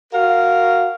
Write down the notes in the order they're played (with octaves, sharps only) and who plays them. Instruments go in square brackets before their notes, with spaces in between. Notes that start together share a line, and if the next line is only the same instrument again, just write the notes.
[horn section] F#4 A#4 F5